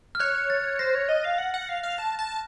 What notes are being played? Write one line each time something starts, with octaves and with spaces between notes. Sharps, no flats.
F6
C#5 F#6
A6
C5 A#6
C#5
D#5
F5
F#5
F#5
F5
F5
A5
A5